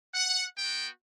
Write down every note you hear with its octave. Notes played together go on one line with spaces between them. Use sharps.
F#5
B3 F#4 G5